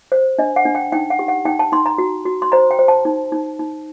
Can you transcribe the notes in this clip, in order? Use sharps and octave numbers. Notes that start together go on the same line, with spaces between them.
C5
D4 D#5
F#5
D4
G5
D#4 G5
F#5
G4
F#5
D#4 G5
A5
D#4 C6
A#5
F#4
F#4
C6
C5 A#5
G5
C5
A5
D#4
D#4
D#4